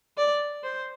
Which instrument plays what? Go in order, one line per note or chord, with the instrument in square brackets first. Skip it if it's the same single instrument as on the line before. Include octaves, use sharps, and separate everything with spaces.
[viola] D5
C5